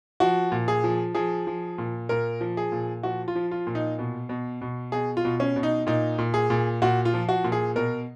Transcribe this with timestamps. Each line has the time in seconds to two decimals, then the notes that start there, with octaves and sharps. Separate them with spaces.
0.20 F3 F#4
0.52 A#2
0.68 G#4
0.84 F3
1.15 F3 G#4
1.47 F3
1.78 A#2
2.09 A#2 A#4
2.41 F3
2.57 G#4
2.72 A#2
3.03 F3 F#4
3.28 F4
3.36 F3
3.51 F4
3.67 A#2
3.75 D#4
3.99 B2
4.29 B2
4.61 B2
4.92 B2 G#4
5.17 F4
5.25 B2
5.40 C#4
5.56 B2
5.63 D#4
5.87 A#2 D#4
6.18 A#2
6.34 G#4
6.50 A#2
6.82 A#2 F#4
7.05 F4
7.14 F3
7.29 F#4
7.44 A#2
7.52 G#4
7.76 B2 A#4